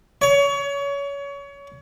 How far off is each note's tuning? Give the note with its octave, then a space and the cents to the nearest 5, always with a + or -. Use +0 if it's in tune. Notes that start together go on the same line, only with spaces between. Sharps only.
C#5 +25